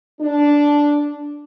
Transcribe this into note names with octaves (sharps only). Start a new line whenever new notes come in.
D4